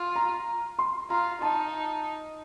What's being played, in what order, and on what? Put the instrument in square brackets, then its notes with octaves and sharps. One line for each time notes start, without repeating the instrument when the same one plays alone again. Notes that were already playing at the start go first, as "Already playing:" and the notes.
Already playing: [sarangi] F4
[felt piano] A#5
C6
[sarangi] F4 [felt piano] A#5
[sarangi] D#4 [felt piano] A5